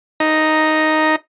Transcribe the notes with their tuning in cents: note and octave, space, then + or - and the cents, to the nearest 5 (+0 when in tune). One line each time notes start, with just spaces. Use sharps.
D#4 +0 A#5 +0